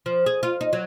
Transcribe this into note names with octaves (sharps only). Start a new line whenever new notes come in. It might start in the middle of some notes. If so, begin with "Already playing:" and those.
F3
G#4
F4
D#4
F#3